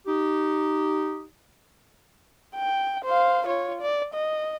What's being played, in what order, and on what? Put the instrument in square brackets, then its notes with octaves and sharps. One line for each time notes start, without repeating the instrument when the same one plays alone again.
[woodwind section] D#4 G4
[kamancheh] G5
C5 F5
F4 C#5
D5
D#5